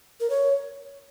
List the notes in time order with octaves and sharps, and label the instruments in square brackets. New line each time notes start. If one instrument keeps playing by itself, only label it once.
[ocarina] A#4
C#5